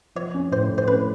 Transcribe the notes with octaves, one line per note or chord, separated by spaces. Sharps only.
F3 C#5
C#4
A2 C5
A2
C5
C#4 B4